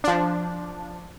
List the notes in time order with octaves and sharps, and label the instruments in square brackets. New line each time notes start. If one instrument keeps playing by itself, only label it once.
[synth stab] F3 D4